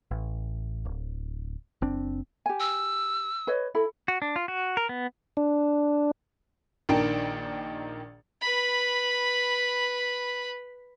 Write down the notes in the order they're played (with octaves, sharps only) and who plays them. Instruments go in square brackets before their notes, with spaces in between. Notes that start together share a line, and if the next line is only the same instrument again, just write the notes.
[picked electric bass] A1
D1
F#1 C4 D4
[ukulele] G4 G#5
[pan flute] E6
[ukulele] B4 C#5 D#5
E4 A4 B5
[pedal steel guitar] F#4
D4
F4
F#4
A#4
B3
[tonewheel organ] D4
[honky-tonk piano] A#1 D#3 D4 A#4 G5
[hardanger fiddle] B4 B5